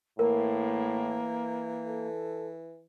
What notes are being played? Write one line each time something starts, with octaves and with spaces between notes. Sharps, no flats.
A2 E3 A#3 A#4
A4